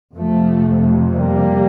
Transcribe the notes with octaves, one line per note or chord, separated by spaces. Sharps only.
F2 C3 F3 A3
G3 A#3